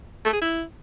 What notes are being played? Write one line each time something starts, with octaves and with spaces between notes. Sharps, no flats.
A3
G#4
E4